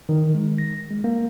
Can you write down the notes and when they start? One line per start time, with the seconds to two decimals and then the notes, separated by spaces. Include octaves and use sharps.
0.09 D#3
0.35 G#3
0.58 A#6
0.91 G#3
1.04 A#3